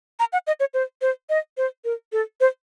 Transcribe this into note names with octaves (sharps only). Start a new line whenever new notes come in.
A#5
F#5
D#5
C#5
C5
C5
D#5
C5
A#4
A4
C5